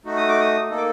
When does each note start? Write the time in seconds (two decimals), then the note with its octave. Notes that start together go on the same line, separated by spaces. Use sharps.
0.05 A3 D#4 F#4
0.17 D#6
0.28 D6
0.40 D#6
0.70 A#3 D#4 A4
0.77 D6